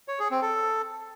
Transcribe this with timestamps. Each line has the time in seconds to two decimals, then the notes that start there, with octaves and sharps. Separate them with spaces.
0.08 C#5
0.19 G#4
0.31 C4
0.42 A4